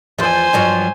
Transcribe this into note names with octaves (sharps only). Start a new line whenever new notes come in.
E2 F3 C5 G#5
G2 F3 F#3